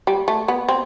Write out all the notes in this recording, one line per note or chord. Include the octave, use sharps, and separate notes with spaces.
G3
A3
B3
C4